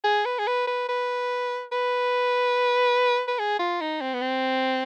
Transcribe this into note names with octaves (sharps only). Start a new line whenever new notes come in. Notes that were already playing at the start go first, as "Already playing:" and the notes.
G#4
B4
G#4
B4
B4
B4
B4
B4
G#4
F4
D#4
C4
B3
C4